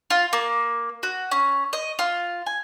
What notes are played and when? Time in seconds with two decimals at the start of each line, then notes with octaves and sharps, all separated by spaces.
0.10 F4
0.33 A#3
1.03 F#4
1.31 C#4
1.73 D#5
1.99 F4
2.46 G#5